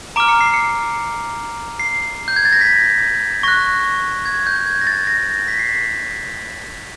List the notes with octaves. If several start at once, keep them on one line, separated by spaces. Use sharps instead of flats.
A#5 D6 F6 D7
C#7
C7
C#7
C7
G6
G#6
A6
A#6
B6
C#6 F#6 A#6
G#6
G6
G#6
A#6
A6
A#6
A#6
B6
C7
B6